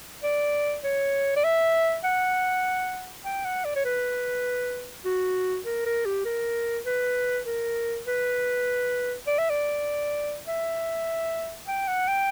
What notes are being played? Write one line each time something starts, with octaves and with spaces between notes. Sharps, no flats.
D5
C#5
D5
E5
F#5
G5
F#5
D5
C#5
B4
F#4
A#4
A#4
G4
A#4
B4
A#4
B4
D5
E5
D5
E5
G5
F#5
G5